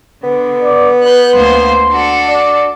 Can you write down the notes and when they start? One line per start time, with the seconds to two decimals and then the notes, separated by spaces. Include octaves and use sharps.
0.24 D3 B3
0.63 D5
1.03 B4 F#6 G6
1.34 D2 A#3 C5 C6
1.90 D4 F#4 A4
2.28 D5